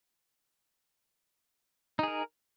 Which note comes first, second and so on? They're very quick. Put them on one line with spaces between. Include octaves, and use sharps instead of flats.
D#4 G#4 A#4